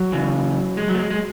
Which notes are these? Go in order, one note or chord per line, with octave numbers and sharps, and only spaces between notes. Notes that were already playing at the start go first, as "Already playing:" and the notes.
Already playing: F#3
C#3 E3
G#3
F#3
A3
G#3
G#3